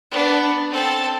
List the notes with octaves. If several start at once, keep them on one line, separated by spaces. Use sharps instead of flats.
B3 D4
C4 A4